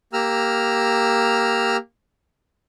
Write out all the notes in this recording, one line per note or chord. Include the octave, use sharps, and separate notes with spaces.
A#3 G4 A#5 E6 F6